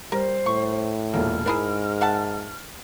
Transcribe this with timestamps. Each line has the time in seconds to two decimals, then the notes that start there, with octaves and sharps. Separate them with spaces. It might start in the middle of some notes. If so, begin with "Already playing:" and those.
0.12 G3 A#4 C5
0.46 A2 C#6
1.14 E1 A#2 A3 A#3 F6
1.46 G#2 D4 E4 G#4 A#4
2.01 E5 F#5 A5